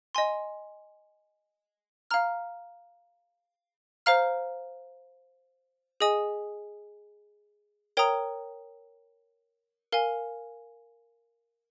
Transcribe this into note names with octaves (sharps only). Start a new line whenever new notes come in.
D#5 G#5 C6
F5 A#5 F6
C5 F5 A#5 F6
G#4 D#5 G#5 D#6
A#4 C#5 G5 A#5 D#6
A#4 F5 G#5